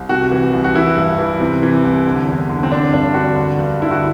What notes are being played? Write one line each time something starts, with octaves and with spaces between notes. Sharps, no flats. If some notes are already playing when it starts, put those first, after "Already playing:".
Already playing: C2
C3 F#4
E3
C2
F#4
E3 E4
G2
E3
C3
E3
C2
D3
E2
D3
C4
D3 D4
G2 D4
D3 F#4
D3
G2
D3 E4
F#4